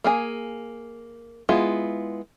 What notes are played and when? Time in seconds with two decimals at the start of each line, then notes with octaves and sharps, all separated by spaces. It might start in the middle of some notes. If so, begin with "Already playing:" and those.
0.04 A#3 G#4 G#5
1.49 G#3 B3 E4 F4